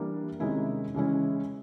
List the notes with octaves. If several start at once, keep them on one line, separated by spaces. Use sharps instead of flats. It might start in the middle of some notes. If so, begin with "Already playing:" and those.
Already playing: E3 G3 A#3 D4
C3 D#3 G#3 C#4 E4
C#3 E3 G#3 C#4 E4